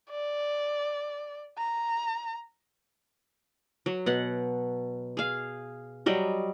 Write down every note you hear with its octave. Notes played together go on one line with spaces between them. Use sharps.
D5
A#5
F#3
B2 F#5
G#4 F5
F#3 G3 D#5